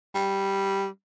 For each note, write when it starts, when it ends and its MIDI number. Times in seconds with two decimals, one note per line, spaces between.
0.15 0.87 55